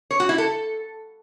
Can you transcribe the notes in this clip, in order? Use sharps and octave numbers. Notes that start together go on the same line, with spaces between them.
C#5
F#4
E4
A4